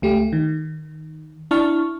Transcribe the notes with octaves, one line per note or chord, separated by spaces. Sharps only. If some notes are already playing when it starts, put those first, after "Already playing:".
C#2 A3 G4
D#3
D4 E4 A5 C#6 F6